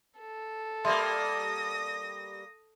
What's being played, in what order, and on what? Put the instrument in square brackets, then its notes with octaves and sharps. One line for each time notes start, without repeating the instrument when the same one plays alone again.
[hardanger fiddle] A4
[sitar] G3 A#3 [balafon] E5 C6 [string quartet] D#6 A#6